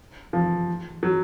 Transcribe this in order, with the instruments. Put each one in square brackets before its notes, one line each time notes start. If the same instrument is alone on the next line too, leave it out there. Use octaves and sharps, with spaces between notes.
[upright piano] F3
F#3